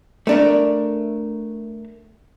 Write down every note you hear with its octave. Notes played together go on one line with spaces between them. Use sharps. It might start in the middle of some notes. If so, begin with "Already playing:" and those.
A3 D4 A#4